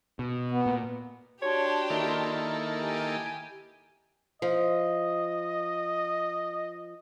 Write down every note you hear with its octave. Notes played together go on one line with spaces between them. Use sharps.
B2
B3
A#2
D4 F#4 G4 C#5 A5 C6
D#3 A#3 E4 A4
G4 G#5
F3 D#5